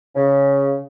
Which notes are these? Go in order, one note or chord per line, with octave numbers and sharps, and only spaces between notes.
C#3